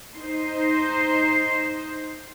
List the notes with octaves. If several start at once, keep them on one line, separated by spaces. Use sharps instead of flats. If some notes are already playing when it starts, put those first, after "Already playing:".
D#4 C5